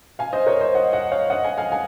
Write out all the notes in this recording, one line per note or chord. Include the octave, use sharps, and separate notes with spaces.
F5 G#5
C5 D#5
A#4 C#5
C5 D#5
D#5 F#5
D#5 F#5
C#5 F5
D#5 F#5
F5 G#5
F5 G#5
F5 G#5